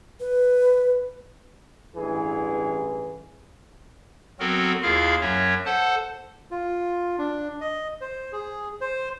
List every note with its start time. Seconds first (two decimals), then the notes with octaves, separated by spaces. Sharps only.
0.20 B4
1.96 A1 G2 E3 G#4
4.40 F#3 B3 C4 F#4 A4 A#4
4.83 D#2 E4 F4 G#4 F5 F6
5.21 F#2 F#3 C#4 C#5 E5
5.66 A4 C5 F#5 A5
6.51 F4
7.18 D4
7.61 D#5
8.01 C5
8.32 G#4
8.81 C5